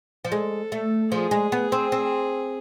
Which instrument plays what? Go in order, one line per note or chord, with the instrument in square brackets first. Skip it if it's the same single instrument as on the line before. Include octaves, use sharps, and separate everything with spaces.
[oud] F3
[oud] G#3 [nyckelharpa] A4
[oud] A3
[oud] F3 [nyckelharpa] G#4
[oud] G#3
B3
C4
C4